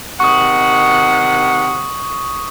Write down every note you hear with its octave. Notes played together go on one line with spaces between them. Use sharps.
C3 D#3 F#5 C#6 D#6